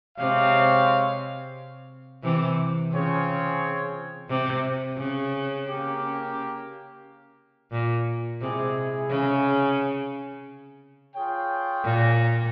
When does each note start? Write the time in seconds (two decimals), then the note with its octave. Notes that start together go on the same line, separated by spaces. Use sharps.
0.18 C3 G#3 C4 G4 C#5 F5
2.23 C3 E3
2.92 C#3 C4 F4 G#4 C#5
4.30 C3
4.98 C#3
5.67 A#3 C#4 G4
7.72 A#2
8.40 C3 G#3 E4 G#4
9.10 C#3
11.15 F4 G#4 C#5 G5
11.84 A#2